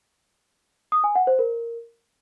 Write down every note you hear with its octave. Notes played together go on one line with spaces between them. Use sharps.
D#6
G#5
F#5
C5
A#4